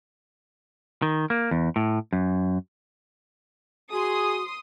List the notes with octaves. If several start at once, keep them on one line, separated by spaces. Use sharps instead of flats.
D#3
A#3
E2
A2
F#2
F#4 G#4 C6 D#6